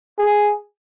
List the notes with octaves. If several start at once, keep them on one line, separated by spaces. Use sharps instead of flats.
G#4